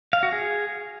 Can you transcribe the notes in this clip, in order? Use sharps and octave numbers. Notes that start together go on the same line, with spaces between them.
F5
F#4
G#4